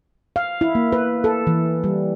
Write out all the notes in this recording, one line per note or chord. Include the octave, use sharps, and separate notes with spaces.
F5
E4
A#3
B4
A4
E3
G3